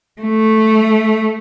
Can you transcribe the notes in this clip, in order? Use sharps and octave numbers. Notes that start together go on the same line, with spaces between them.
A3